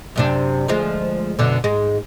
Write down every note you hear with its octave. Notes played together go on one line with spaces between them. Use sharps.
F#2 C3 D4
D2 F3 G#3
F#2 B2 D3
G#2 G#3